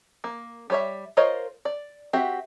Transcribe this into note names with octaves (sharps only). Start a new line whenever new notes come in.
A#3
G3 C#5 E5
F4 A#4 C5 C#5 D#5
D5
C4 F#4 G4 E5